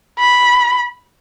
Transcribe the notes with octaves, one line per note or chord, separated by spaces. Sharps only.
B5